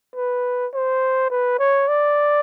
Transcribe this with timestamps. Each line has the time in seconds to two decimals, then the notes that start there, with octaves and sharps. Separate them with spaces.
0.16 B4
0.74 C5
1.30 B4
1.59 C#5
1.88 D5